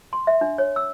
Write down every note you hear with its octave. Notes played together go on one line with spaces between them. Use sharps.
C6
E5
D4
C#5
E6